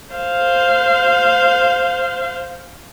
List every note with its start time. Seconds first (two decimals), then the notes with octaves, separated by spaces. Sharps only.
0.13 C5 F5